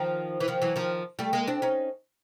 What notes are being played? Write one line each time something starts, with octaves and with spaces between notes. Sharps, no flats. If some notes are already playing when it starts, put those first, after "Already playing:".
Already playing: D#3 F3
E3
D#3 F3
E3 F#3
D#3 F3
G3 A3
G#3 A#3
C4 D4
C#4 D#4